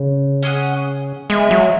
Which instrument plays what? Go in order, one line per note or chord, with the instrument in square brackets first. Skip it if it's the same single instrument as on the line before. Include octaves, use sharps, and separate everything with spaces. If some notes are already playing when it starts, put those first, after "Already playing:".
Already playing: [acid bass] C#3
[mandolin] C#4 G#4 D#5 F#5
[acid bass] G#3 [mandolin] B3 E4 B4
[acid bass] F#3